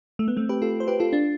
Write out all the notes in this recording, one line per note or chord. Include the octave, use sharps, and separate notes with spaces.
A3
B3
A3 C4
G4 B4
F4 A4
C5
G4 B4
F4 A4
D4 F4